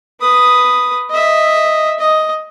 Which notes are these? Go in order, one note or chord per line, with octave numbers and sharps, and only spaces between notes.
B4 D#6
D#5 E5
D#5